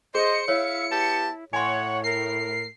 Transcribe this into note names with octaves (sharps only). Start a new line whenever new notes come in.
G#4 C5 D#5 C#7
E4 C#5 E5 F5
B3 G4 A5
A2 C#5 F#5 G#5 C6
A#4 C7